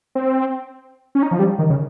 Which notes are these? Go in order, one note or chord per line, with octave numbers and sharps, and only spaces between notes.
C4
C#4
D#4
F3
G3
D#3
C#3